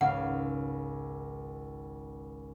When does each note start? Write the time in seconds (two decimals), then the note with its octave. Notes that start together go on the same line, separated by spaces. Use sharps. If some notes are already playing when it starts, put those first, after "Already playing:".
0.01 G#1 C#2 C#3 C#4 F5 F#5